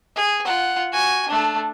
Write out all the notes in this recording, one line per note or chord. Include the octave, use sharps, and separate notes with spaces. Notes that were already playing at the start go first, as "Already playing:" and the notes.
G#4
F4 F#5
F#4 G#5
A3 D4